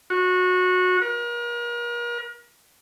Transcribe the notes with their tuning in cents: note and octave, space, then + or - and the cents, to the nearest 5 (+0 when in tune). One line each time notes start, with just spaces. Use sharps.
F#4 -20
A#4 +40